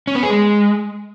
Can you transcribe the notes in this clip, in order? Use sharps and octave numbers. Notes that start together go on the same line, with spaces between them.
C#4
B3
G#4
G#3